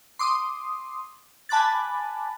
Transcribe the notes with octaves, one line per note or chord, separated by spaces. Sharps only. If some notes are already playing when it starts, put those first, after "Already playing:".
C6 D6 D#6
G#5 A5 B5 D6 F#6 A6